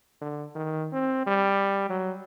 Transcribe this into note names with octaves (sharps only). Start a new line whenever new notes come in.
D3
D#3
C4
G3
F#3